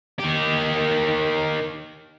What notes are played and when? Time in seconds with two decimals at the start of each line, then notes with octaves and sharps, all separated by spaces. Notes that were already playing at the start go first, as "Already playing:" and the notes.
0.19 D#3 G4